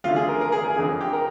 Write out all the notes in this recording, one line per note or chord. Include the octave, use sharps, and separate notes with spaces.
D2 D3 F4
G#4
A#4
A#4
G#4
G#4
F2 D3 G#4
G4
A#4